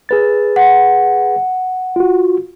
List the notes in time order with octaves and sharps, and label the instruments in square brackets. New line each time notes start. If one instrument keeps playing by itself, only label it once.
[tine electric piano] G#4 B4 A6
[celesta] F#5
[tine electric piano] F4 F#4